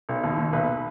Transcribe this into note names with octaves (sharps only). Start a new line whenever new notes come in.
B1
D#2
D#2
B1 B4